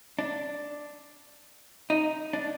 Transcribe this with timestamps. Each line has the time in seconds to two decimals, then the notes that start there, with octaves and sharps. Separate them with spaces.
0.19 D4
1.90 D#4
2.33 D4